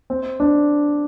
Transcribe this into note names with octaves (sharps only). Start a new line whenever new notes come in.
C4
D4